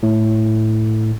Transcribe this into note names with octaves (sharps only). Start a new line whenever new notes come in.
A2